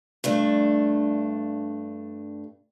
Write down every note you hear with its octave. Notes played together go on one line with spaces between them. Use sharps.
G2 A3 D4